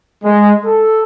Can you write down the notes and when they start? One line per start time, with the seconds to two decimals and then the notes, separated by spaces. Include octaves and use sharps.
0.24 G#3
0.65 A4